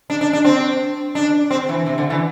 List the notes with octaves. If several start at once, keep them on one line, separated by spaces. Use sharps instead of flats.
D4
D4
D4
C4
D4
C4
E3
C3
D3
E3